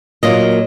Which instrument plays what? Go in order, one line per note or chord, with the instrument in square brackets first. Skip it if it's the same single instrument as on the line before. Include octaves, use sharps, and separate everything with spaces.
[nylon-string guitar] A#2 F#3 A#3 F4 D#5